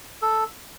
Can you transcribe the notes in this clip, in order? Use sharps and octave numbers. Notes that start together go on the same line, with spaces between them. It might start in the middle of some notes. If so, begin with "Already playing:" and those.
A4